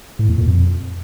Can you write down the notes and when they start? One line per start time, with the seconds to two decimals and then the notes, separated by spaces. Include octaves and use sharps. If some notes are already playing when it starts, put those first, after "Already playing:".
0.19 A2
0.28 E2
0.38 A#2
0.47 F2